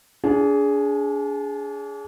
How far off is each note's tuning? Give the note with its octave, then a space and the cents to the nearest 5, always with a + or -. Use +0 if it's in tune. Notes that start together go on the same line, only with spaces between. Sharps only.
D4 -35 G#4 +0